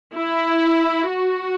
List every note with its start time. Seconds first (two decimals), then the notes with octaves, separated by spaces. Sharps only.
0.15 E4
1.08 F#4